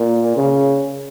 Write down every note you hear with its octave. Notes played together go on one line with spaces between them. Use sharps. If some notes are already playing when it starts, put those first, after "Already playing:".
Already playing: A#2
C#3